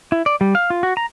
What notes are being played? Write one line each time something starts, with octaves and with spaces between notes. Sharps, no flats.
E4
D5
G3
F5
F4
F#4
A#5